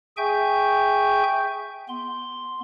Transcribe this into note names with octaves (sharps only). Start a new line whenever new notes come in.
G#4 E5 G5 G#5 C#6 G6
B3 C6